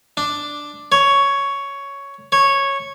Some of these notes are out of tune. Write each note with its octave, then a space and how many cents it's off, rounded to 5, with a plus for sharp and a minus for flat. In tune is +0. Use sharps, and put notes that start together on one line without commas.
D4 +0
C#5 +5
C#5 -10